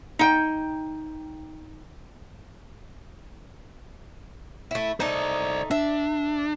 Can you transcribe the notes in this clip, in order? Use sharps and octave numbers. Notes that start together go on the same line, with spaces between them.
D#4 G5
A3 E4
A3 D#4 C5 D5
D4 E5